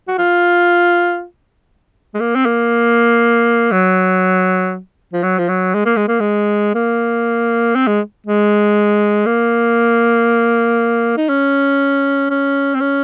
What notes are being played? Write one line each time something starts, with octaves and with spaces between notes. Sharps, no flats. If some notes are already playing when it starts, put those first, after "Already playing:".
F#4
F4
G#3
A#3
C4
A#3
F#3
F3
F#3
F3
F#3
G#3
A#3
G#3
A#3
G#3
A#3
C4
G#3
G#3
A#3
D#4
C#4
C#4
C4
C#4